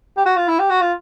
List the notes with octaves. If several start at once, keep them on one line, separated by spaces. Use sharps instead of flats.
G4
F#4
F4
E4
G4
F#4
F4